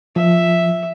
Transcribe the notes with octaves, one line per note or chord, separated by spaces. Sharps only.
F3 E5